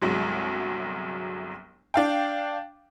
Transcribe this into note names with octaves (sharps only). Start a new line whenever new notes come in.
G1 C2 F#3 G#3
D4 F5 G5